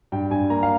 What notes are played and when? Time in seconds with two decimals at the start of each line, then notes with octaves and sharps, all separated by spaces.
0.12 G2 G5
0.31 G2 G#5
0.50 A#3 A#5
0.63 F5